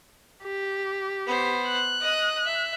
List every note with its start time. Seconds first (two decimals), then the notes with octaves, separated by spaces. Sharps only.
0.43 G4
1.27 B3 C5
1.66 F#6
2.00 D#5 D#6
2.44 E5